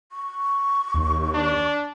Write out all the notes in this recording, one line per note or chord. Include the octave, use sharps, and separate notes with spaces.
C#6
D#2
D4